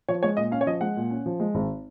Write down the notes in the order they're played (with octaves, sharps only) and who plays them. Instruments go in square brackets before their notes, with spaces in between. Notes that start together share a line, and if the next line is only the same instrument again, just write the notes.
[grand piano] F3 [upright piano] C#5
[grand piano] G#3 [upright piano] C#5
[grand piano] A#2 [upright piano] D#5
[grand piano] C#4 [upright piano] F5
[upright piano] C#5
[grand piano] F3 [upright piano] D#5
[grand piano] G#3 [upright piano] F#5
[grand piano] A#2
C#4
F3
G#3
G#1